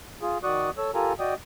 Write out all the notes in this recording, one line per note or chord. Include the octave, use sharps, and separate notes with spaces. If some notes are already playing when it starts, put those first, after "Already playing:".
F4 G#4
D#3 F#4 D5 C#6 D#6 F#6
A4 C#5 E6
F4 G4 A4 A#4 G#5 A#5
F#4 D5 D#5 G5 D#6